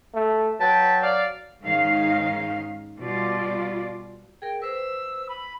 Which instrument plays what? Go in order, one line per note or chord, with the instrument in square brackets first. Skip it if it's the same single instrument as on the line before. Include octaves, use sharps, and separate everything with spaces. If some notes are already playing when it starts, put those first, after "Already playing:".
[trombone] A3
[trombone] F#3 [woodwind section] B4 G5 A5
[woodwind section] D5 F5
[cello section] G#2 D#3 C#4 D#4 F5
B2 G3 F4 D5
[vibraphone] G#4 A#4 [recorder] G5
[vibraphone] B4 C5 [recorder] E6
[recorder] B5